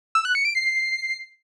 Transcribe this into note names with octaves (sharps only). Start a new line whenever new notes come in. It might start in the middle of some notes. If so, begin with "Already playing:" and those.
E6
F#6
C#7
D7
C7